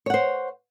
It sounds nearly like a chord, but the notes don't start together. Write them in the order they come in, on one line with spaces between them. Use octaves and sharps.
C#5 F#5 C5